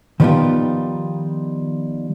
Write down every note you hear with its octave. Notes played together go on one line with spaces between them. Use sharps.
D#3 F3 G3 B3 D#4 F4